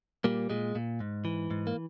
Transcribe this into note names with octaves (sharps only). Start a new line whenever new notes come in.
A#2 G3 A#3
A#2 G#3
A#2
G#2
E3
G#2
A#3